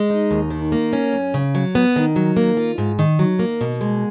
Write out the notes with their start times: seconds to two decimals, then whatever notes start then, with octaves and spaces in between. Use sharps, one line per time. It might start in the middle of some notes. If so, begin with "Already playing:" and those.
Already playing: G#3
0.10 D#4
0.31 D#2
0.50 D#3
0.72 A#3
0.93 C#4
1.13 F#2
1.34 C#3
1.55 F#3
1.75 B3
1.96 D#3
2.16 F#3
2.37 A#3
2.57 F4
2.78 G#2
2.99 D#3
3.19 F#3
3.39 A#3
3.61 B2
3.81 G#3